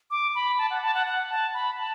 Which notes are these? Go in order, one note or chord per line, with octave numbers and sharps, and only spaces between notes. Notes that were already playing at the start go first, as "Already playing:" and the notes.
D6
B5
A5
F#5
A5
F#5
F#5
A5
B5
A5